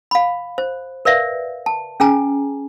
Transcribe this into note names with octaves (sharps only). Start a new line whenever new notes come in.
F5 B5
C5
A#4 B4 D5 E5 F5
A5
C#4 G#4 G#5 A#5